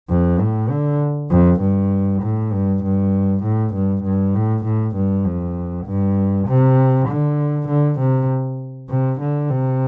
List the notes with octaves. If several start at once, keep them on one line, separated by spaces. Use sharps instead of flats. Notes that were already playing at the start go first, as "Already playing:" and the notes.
F2
A2
D3
F2
G2
A2
G2
G2
A2
G2
G2
A2
A2
G2
F2
G2
C3
D3
D3
C3
C3
D3
C3